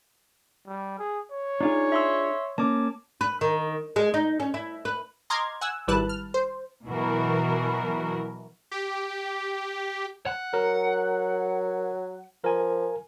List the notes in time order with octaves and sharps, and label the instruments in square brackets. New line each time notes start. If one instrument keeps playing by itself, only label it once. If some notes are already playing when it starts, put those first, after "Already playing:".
[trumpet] G3
G#4
C#5
[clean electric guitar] D4 F4 G#4 [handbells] D#4
[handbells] E5 C6 E6
[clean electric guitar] A#3 C#4 [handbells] A5 D6
[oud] B4
D#3
G#3
D#4
C#4
E4
B4
[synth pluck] D#5 A#5 C6 D6 F6 G#6
F#5 G#5 E6
G#1 G3 E4 B4 A5 F#6
F6
C5
[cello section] B2 E3 F#3 E4 F#4 A#4
[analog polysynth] G4
[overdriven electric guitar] F#5
[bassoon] F#3 [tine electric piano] A#4
[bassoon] F3 [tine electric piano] A#4 G#5